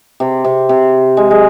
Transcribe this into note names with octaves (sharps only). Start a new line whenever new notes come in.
C3
C3
C3
G#3
G#3